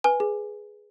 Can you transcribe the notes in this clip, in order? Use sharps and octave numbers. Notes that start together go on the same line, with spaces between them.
B4 G#5
G#4